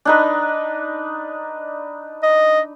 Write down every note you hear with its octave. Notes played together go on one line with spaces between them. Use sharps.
D4 D#4 B4
D#5